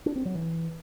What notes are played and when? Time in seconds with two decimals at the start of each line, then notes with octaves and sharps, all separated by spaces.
0.06 D4
0.16 C4
0.25 F#3
0.35 E3